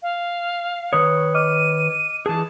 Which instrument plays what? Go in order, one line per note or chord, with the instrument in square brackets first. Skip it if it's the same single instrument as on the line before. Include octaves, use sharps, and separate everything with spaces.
[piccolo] F5
[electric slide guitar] D#3 B4 C#5 [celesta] D#6
[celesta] D#5 D6 F6 [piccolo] D#7
[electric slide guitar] E3 G#4 [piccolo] A5